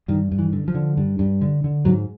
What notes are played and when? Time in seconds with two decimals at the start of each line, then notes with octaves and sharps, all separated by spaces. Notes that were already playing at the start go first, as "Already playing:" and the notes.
0.08 G2 D#3
0.31 G2
0.39 E3
0.53 D3
0.68 F3
0.75 D3
0.97 G2
1.19 G2
1.41 D3
1.64 D3
1.85 G#2 F#3